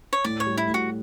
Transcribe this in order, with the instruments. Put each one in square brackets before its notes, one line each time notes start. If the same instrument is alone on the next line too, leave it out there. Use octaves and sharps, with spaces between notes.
[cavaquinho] C#5
[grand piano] A2 [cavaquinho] D5
[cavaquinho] C#5
[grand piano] G3
[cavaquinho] E4
[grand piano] A2
[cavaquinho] F#4